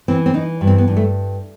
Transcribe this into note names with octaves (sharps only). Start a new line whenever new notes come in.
E3 C4
C4
E3 D#4
G2
C4
B3
G2
A3